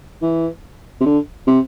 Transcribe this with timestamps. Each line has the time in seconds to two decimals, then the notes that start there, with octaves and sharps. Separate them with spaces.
0.22 E3
1.01 C3
1.06 D3
1.47 C3